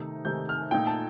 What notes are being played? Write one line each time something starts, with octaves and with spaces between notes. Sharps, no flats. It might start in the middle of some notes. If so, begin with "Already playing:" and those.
Already playing: C3 D#3 A3 D#4
C3 D#3 A3 D#4 G6
F6
A#2 A3 D#4 G5
A5